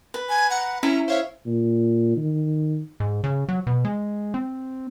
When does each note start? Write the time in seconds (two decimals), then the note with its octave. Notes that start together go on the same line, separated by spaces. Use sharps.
0.14 B4
0.29 G#5
0.50 F#5 A#5
0.83 C#4 E4 A#5
1.08 C5 C#5 E5 F5
1.46 A#2
2.16 D#3
3.00 G#2
3.24 C#3
3.49 F#3
3.67 B2
3.85 G#3
4.34 C4